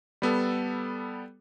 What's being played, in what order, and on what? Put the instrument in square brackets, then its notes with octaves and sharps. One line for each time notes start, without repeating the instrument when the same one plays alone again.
[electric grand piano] G3 B3 A4